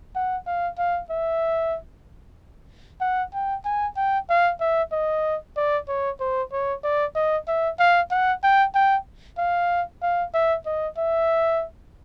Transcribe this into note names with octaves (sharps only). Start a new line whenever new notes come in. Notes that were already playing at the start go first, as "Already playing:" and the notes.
F#5
F5
F5
E5
F#5
G5
G#5
G5
F5
E5
D#5
D5
C#5
C5
C#5
D5
D#5
E5
F5
F#5
G5
G5
F5
F5
E5
D#5
E5